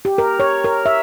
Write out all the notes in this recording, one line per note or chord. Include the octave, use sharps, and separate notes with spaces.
G4
A#4
C#5
A#4
E5